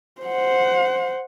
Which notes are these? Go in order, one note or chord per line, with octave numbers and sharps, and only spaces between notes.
C5 F#5